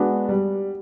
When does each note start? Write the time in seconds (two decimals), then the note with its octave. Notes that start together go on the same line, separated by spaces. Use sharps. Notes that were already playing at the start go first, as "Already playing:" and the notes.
Already playing: G#3 B3 D4 F#4
0.29 G3